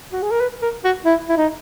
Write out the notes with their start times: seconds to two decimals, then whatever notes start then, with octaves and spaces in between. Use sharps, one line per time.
0.12 F#4
0.22 G#4
0.31 A#4
0.40 B4
0.62 A#4
0.84 F#4
1.05 E4
1.29 E4
1.37 D#4